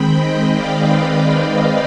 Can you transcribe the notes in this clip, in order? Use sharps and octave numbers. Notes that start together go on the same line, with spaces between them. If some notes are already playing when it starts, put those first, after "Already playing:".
Already playing: D#3 G#3 C4 G5 B5
D#5 G5
D5 F5
B4